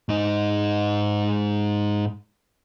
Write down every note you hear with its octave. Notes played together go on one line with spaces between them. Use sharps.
G#2 D#4